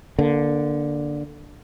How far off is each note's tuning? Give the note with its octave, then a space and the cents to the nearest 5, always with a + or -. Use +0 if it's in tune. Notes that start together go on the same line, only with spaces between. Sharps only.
D3 +0 A#3 +20